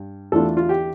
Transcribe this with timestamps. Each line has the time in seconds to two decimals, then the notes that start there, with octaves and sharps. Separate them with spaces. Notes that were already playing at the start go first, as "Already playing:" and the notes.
Already playing: G2
0.32 E2 E3 A3 D4 F4 A4
0.57 F4
0.69 G4